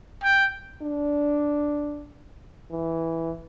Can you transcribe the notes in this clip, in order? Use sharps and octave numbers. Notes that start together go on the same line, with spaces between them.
G5
D4
E3